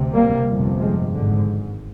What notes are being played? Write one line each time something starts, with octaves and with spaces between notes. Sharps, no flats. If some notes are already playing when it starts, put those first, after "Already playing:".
Already playing: D2 C3
G3 A#3
G1 F2 C3
F3 G#3
G#1 G#2 D3